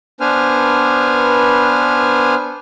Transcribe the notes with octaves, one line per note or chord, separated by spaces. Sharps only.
B3 D4 B4 C5 G#5 F6